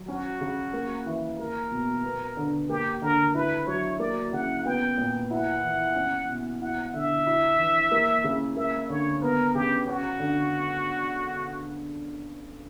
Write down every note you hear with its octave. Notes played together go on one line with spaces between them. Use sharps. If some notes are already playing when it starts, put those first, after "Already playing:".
Already playing: F#3
C#4 F#4
C#3
A#3
E3
A#3 A#4
B2
B3
D3
A#3 G4
D3 A#4
E4 B4
F#3 C#5
A#3 D5
C#3 F#5
B3 G5
A#2
E4 F#5
E3
C#4
B2
E4 F#5
D3 E5
E4
E3
A#3
C#3
A#3 E5
D3 C#5
B3 A#4
C#3 G4
C#4 F#4
D3